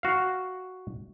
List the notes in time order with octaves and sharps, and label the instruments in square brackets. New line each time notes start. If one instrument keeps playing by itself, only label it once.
[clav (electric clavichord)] F#4 F5